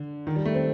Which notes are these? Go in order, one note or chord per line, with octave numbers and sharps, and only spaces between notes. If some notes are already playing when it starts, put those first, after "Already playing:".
Already playing: D3
D#3
G3
A3
C4